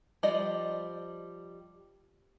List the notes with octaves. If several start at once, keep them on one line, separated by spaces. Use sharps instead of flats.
F3 G3 D5 D#5